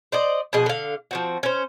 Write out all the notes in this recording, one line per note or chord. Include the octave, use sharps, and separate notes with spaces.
C5 D5 D#5
B2 F3 G#4 D#5
D3 F5
F3 C4 F#4
C#4 C5